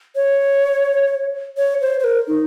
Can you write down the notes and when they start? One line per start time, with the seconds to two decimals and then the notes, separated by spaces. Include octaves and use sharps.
0.16 C#5
1.57 C#5
1.81 C5
2.00 C5
2.04 A#4
2.28 D#4